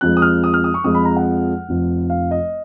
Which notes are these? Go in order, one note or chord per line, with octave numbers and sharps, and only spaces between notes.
F2 F3 G#3 F#6
D#6
F6
D#6
F6
D#6
C#6
F2 F3 G#3 D#6
B5
A#5
F#5
F1 F2 F3
F5
D#5